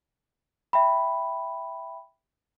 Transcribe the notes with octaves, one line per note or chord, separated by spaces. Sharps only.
E5 G5 B5